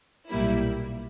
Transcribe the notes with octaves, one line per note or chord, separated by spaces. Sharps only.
B1 A#2 G3 A#3 E4